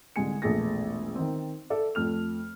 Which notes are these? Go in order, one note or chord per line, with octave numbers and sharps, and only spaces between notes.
C2 D3 G#3 G#5 C#7
E1 A#1 A3 G#4 A6 A#6
D#3 C4
A4 D5 E5
F2 A3 F6 F7